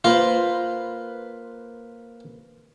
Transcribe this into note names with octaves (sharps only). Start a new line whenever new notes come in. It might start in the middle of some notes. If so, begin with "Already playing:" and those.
A#3 F4 B4 C5